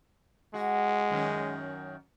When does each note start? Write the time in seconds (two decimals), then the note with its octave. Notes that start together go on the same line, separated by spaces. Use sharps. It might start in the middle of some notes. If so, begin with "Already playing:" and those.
0.54 G#3 F#4
1.11 F#2 D#3 C#4